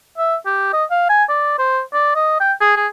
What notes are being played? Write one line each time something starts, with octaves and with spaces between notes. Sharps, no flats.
E5
G4
D#5
F5
G#5
D5
C5
D5
D#5
G5
G#4
G#4